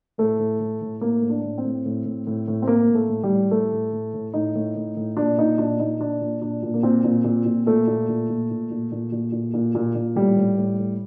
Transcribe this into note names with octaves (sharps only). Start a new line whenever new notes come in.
A2 A3
A2
A2
A2
A2 A#3
A2
D4
A2
C4
A2
A2
A2
A2
A2
C4
A2 A#3
A2
A3
A2
G3
A2
A2 A3
A2
A2
A2
A2 D#4
A2
A2
A2
A#2 D4
A#2 D#4
A#2 D4
A#2 D#4
A#2 D4
A#2
A#2 D4
A#2
A#3
A#2 C4
A#2
A#2
A#2
A#2 A3
A#2
A#2
A#2
A#2
A#2
A#2
A#2
A#2
A#2
A#2
A#2
A2 G3
A2
A2
A2